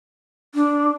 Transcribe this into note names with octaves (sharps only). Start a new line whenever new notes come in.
D4